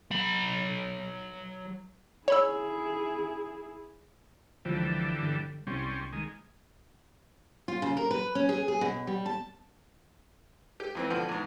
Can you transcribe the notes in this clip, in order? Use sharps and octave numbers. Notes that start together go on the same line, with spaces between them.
F#3 B5
E4 G#4 C#5 B5 E6
C#2 D3 E3 F3 G3
G1
C2 G3 C4 C#4
D#3 G#3
F4
C#3
A#4
B4
C#4
G#4
G#4
B2
G3
A5
G4
F2 E3 C4
B2 D3 F3
E2 G#2